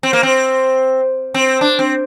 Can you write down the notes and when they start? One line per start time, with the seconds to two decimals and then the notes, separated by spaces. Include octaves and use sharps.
0.03 C4
0.13 A#3
0.23 C4
1.34 C4
1.61 D4
1.79 C4